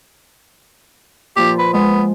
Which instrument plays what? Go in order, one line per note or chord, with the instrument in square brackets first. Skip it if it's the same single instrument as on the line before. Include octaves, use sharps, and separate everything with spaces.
[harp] A#2 F3 F4 [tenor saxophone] G4
[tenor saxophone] B4
[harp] G#3 [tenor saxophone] B3